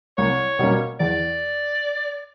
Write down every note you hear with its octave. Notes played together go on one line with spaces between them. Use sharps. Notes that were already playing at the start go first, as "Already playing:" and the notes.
C2 C#5
B2 G3 A#3 C#4
E2 D5